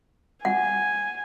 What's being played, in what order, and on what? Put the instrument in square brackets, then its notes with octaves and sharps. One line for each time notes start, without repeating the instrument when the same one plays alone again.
[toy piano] F#5 [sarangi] G#5